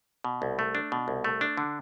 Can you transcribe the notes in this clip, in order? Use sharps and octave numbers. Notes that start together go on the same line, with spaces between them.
B2
C2
A3
D4
B2
C2
A3
D4
D3